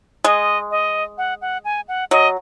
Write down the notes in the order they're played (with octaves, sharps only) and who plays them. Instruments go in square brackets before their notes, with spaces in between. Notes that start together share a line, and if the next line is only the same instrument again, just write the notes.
[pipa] G#3 [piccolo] D#5
[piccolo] D#5
F#5
F#5
G#5
F#5
[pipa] F#3 [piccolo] D#5